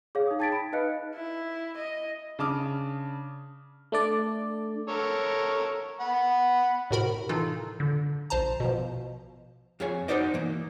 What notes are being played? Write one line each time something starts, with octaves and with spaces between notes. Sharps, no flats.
G#4 C#5 F5
D#4 D#6
G5 A5 G#6 A6 B6 D7
B5
D#4 B4 D#5 F5 F#6 C#7
E4
D#5
C#3 D4 A5 D6 D#6 F6
A3 D4 D5
A4 A#4 C#5
F#5 B5
A2 C3 F#4 A#4 B5
E3 D#4 F4 A4
D3
A#1 C5 A5 A#5
B2 F3
F2 F4 G#4 C#5 G#5
D#4 F4 F#4 C5 D5 D#5
E3 A#3